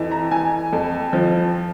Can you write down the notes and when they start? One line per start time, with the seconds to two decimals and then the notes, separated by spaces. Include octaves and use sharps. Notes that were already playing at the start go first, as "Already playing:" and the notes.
Already playing: F2 E3
0.11 A#5
0.31 E3 G#5
0.72 F2
1.13 F3